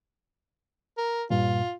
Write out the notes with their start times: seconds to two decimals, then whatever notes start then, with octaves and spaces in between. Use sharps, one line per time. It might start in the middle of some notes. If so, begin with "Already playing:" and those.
0.98 A#4
1.30 G2 A#2 F4